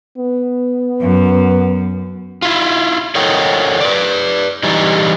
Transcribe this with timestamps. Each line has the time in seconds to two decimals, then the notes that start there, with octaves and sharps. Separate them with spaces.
0.18 B3
1.01 F#2
2.42 E4 F4
3.15 A4 A#4 C#5 D#5 F#5 G5
3.81 B4 D5
4.63 E3 G3 D#4